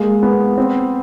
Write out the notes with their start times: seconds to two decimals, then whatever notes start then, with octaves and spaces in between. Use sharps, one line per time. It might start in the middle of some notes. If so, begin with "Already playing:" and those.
Already playing: G#3 A#3
0.23 B3
0.58 C4